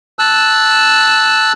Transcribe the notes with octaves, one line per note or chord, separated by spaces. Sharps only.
A5 E6 F#6